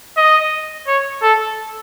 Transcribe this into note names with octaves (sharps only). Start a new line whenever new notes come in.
D#5
C#5
A4